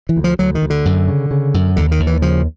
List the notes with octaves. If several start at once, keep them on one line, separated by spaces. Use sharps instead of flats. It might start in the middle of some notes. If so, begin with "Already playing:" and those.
E3
D2
F3
D2 F#3
D#3
D2
D3
F#2
C#3
C#3
F#2
D#2 D3
D#3
D#2
E3
C#3 F3